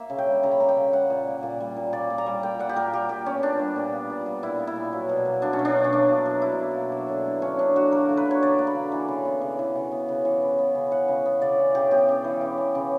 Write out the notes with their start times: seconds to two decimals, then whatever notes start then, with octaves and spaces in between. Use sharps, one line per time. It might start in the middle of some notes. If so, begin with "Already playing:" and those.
Already playing: A#3 E5
0.10 C#3
0.18 G5
0.27 G3
0.43 C#3 A#5
0.52 B5
0.60 A#3 A#5
0.69 G5
0.77 C#3
0.93 G3 F#5
1.10 A#2
1.27 A#3
1.43 A#2
1.60 G3
1.76 A#2
1.93 A#3 D5
2.10 A#2
2.18 A#5
2.26 G3
2.43 A#2 G5
2.59 A#3 F#5
2.69 G4
2.76 A#2 A#4
2.93 G3 G4
3.09 A#2 G4
3.26 B3 C#4
3.43 A#2 D4
3.59 G3
3.76 A#2
3.93 B3
4.10 A#2
4.26 G3
4.43 A#2 E4
4.59 B3
4.67 E4
4.76 A#2
4.93 F#3
5.09 B2
5.26 A#3
5.42 B2 D4
5.53 C#4
5.59 F#3
5.65 D4
5.75 B2
5.84 C#4
5.93 A#3 D4
6.09 B2
6.26 F#3
6.42 B2 E4
6.59 A#3
6.76 B2
6.92 F#3
7.08 D3
7.26 A#3
7.42 D3 C#4
7.58 F#3 D4
7.76 D3 F#4
7.91 A#3 A#4
8.09 D3
8.17 B4
8.26 F#3
8.31 C#5
8.42 D3 D5
8.59 A#3
8.67 B5
8.75 D3
8.92 E3
9.08 C#3
9.25 B3
9.41 C#3
9.59 E3
9.75 C#3
9.91 B3
10.09 C#3
10.25 E3
10.42 C#3
10.59 B3
10.75 C#3
10.91 E3 F#5
11.08 C#3
11.25 B3
11.41 C#3 D5
11.59 E3
11.75 C#3 G4
11.91 B3 G4
12.08 C#3
12.24 E3
12.41 C#3
12.58 B3
12.75 C#3